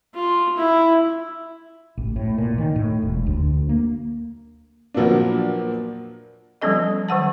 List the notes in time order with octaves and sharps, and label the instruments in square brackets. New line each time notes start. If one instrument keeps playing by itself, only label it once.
[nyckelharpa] F4
E4
[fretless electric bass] A1
A2
A#2
D#3
A2
E1
D2
A#3
[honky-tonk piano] A#2 F3 F#3 A#3 B3 D4
[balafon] F3 G3 B3 C#4 A4 D#5
D#3 F#3 F#5 A5